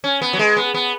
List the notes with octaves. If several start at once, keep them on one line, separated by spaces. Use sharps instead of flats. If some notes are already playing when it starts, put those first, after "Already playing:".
C#4
B3
F#3
G#3
B3
B3